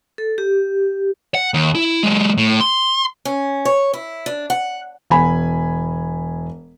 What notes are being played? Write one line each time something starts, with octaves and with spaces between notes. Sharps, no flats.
A4
G4
F#5
D#2
E4
F#3 G#3
A2
C6
C#4
C#5
E4
D4
F#5
E1 G#5 B5